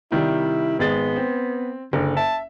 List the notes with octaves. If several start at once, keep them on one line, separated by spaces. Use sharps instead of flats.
C3 D#3 G3 E4
G#1 G#3 B3 A6
C4
F#1 D3
E5 A5